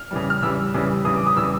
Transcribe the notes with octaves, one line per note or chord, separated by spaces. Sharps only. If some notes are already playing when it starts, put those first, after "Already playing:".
Already playing: F6
C#3 E3 G3
F6
C#3 E3 G3 E6
C#3 E3 G3
C#3 E3 G3 D#6
D6
D#6
C#3 E3 G3 E6